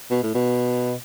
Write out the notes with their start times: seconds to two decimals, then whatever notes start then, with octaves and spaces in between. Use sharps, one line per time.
0.11 B2
0.23 A2
0.35 B2